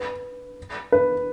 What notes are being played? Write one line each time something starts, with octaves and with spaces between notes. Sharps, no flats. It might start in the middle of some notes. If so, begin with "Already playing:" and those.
Already playing: B4
B4